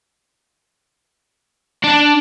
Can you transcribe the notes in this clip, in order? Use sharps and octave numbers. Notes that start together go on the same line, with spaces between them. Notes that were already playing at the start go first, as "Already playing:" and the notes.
D4